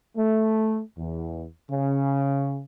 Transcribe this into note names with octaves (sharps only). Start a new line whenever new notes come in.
A3
E2
C#3